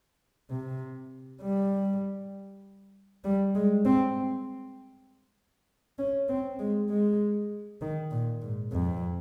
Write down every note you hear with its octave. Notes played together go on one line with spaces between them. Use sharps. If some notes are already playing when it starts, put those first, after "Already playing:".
C3
G3
G3
G#3
C4
C#4
C4
G#3
G#3
D#3
A#2
G#2
F2